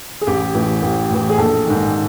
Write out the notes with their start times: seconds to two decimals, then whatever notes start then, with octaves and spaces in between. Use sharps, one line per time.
0.21 G#4
0.27 A1 G4
0.55 A2 E3
0.82 A1
1.10 A2 E3
1.30 G#4
1.38 A#1 A4
1.66 G#2 D#3